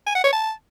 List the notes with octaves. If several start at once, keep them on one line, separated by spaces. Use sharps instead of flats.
G#5
F#5
C#5
A5